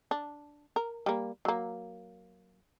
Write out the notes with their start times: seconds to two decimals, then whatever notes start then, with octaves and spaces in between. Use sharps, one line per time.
0.11 D4
0.76 A#4
1.06 G3 A#3
1.45 F#3 A#3